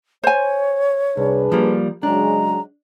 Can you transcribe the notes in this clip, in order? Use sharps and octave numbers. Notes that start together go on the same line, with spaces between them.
C5 C#5 G#5
C2 D4 G#4 B4
F3 G3 A#3
C#3 F#3 G#3 D4 A#5